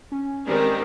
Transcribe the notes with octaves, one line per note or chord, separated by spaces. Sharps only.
C#4
D#3 G3 G#3 C4 G4 A#4